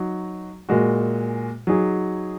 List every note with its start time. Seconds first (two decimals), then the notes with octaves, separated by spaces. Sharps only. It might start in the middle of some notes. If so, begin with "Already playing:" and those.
Already playing: F#3 D#4 F#4
0.69 A#2 G#3 F#4
1.67 F#3 D#4 G#4